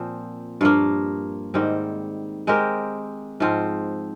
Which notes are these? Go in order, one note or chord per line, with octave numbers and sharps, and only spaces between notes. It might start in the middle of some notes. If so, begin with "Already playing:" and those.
Already playing: A#2 F3 C4
G2 F3 A#3
G#2 D#3 G3 C4
G#3 C4 G4 A#4
G#2 F3 C4